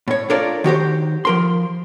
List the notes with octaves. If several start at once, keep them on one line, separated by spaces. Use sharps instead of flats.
A2 C#5
D4 F4 A4 A#4 C#5 D5
D#3 F#4 G4 C5
F3 A#4 C6